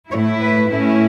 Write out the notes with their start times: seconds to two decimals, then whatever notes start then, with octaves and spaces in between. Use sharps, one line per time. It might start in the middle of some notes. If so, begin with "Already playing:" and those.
0.11 A2 A3 E4 C#5
0.41 B4
0.70 A2 A3 C#4 E4